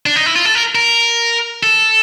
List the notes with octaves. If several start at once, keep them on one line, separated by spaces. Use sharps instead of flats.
D4
D#4
E4
F4
A4
A#4
A#4
A4